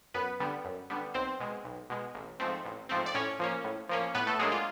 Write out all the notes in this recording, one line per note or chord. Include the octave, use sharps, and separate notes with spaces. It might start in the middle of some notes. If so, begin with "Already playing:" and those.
F#2 B3 B4
D3 G3 B3
F#2
D3 G3 B3
B1 C4 C5
B2 G#3
B1
B2 G#3
A1
G#2 F3 A3 C4
A1
G#2 F3 A3 C4
D5
A2 C#4 C#5
F3 A#3 C#4
A2
F3 A#3 C#4
A2 B3 B4
A3 A4
F#3 G#3 A#3 D4 G#4
F4